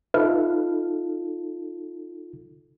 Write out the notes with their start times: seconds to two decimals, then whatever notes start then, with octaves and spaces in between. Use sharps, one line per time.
0.14 D#4 F4 A4 B4 E5 F6